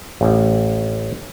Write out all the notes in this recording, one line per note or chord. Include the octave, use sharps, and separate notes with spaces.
A1